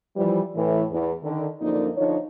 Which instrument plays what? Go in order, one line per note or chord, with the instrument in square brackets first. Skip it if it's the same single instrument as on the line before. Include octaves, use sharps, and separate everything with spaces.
[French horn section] E3 F3 G3
A2 E3
E2
D3 D#3
F#2 D3 F3 A#3 D#4 D5
D3 F3 D#4 C#5